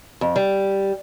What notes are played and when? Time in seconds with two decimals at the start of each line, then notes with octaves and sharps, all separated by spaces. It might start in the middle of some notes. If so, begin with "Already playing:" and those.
0.21 F2
0.36 G3